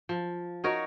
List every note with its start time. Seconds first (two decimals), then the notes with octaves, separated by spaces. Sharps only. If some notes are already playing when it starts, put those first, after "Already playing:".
0.09 F3
0.64 D#4 F#4 A#4 C#5